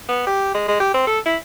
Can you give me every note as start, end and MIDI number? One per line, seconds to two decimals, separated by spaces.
0.09 0.25 59
0.27 0.51 67
0.54 0.64 56
0.68 0.79 56
0.80 0.93 67
0.94 1.07 60
1.07 1.19 69
1.26 1.37 64